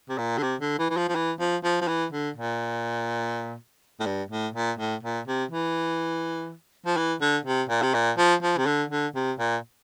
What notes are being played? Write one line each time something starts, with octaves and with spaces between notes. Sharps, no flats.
C3
A#2
D3
C3
D3
E3
E3
F3
F3
E3
F3
F3
F3
E3
D3
A#2
A2
G2
A2
A#2
A2
A#2
C3
E3
F3
E3
D3
C3
A#2
C3
A#2
F3
F3
C3
D3
D3
C3
A#2